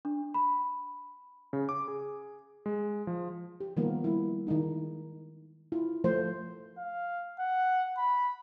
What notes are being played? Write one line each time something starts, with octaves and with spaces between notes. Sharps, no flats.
D4
B5
C#3
D6
G#4
G#3
F3
G4
D#3 F3 G3 A#3 B3 F4
G3 E4
D#3 G#3 D#4 E4
E4 F4
F3 A3 C5
F5
F#5
B5